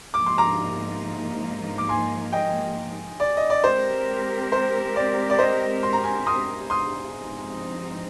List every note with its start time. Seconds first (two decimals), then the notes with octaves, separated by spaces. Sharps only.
0.14 G#2 F3 A#3 D#4 D6
0.26 C6
0.38 A#5 D6
1.78 D6
1.89 G#5 C6
2.32 D#5 G5
3.20 D5
3.37 D#5
3.50 D5
3.64 G#3 C4 G4 A#4 C5
4.52 C5
4.96 D5
5.30 D5
5.39 C5 D#5
5.83 C6
5.93 A#5
6.03 G#5 C6
6.26 C6 D#6
6.70 C6 D#6
7.15 G#2 F3 C4 D#4